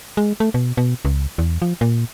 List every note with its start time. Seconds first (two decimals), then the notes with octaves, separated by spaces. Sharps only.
0.17 G#3
0.40 A3
0.54 B2
0.77 B2
1.05 C#2
1.38 E2
1.62 F3
1.81 A#2